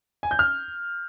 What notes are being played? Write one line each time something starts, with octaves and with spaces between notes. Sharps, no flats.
G#5
G6
F6